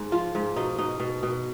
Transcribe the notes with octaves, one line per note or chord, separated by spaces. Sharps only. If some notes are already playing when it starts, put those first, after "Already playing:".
Already playing: G#2
F3 F4
G#2
B2 D#4
B2 D#4
B2
B2